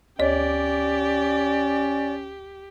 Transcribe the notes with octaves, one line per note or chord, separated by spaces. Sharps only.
D2 C#4 G4 C#5 D5